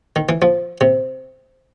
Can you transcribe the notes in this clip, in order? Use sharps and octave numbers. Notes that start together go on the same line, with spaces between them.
D#3
E3
F3
C3